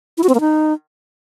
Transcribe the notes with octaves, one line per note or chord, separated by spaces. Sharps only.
E4
F#4
C4
A#3
D#4